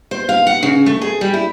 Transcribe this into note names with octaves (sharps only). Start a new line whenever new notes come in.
C5
F5
F#5
C#3
A3
G#4
G3
E4